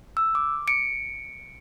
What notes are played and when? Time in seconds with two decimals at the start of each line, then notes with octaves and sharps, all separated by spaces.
0.17 E6
0.35 D6
0.68 C#7 D7